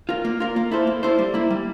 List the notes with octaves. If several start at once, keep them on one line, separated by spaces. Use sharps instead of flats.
F4 A#4
A#3
F4 A#4
A#3
E4 A4 C5
A#3
E4 A4 C5
G3
A#3 E4
G3